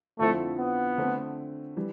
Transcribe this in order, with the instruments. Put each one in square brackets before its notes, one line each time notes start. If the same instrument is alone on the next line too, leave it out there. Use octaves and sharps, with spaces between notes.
[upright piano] F2 D3 F3 C4 E4 [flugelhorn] A3
[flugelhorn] B3
[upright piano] D3 A3 C4
E3 G3